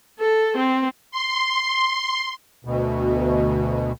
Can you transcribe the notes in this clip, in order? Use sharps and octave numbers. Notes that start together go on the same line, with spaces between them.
A4
C4
C6
D2 B2